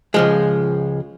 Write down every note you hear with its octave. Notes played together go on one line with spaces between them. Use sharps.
C#2 F3 G#3